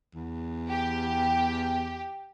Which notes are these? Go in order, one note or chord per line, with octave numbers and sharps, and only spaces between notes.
E2
G4